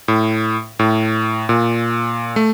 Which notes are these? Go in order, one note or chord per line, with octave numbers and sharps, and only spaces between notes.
A2
A2
A#2
A3